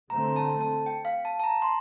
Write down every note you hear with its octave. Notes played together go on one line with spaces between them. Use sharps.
D3 A3 C4 A#5
A5
A5
G5
F5
A5
A5
A#5
C6